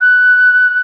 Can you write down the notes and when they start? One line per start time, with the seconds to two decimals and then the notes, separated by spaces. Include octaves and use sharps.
0.01 F#6